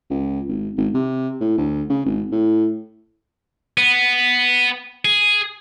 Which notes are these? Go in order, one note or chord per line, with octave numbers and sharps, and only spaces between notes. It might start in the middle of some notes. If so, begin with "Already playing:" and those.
C#2
G#1
G#1
C3
A2
D2
C#3
G#1
A2
B3
G#4